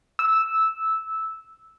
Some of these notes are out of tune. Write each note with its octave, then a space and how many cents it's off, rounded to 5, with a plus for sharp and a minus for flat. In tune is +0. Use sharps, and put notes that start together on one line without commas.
E6 -10